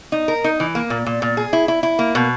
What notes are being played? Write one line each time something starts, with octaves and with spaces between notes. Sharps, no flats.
D#4
A#4
D#4
E3
A#3
A#2
A#2
A#2
G#4
E4
E4
E4
A#3
B2